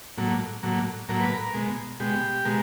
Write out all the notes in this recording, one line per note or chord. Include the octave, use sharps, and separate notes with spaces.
A2 F#3 A#3
A2 F#3 A#3
A2 F#3 A#3 A#4
B4
A#4
B2 G#3
B2 G#3 G4
B2 G#3 A#4